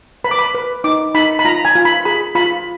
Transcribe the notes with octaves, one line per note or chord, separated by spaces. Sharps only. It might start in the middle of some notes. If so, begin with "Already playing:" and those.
B4 B5
D6
B5
B4
D#4 D6
D#4 B5
B5
F4 A#5
G#5
F4
B5
G#4 B5
F4 B5